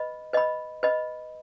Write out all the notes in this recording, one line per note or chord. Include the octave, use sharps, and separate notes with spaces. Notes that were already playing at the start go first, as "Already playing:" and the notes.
Already playing: B4 D#5 B5
B4 D#5 B5
B4 D#5 B5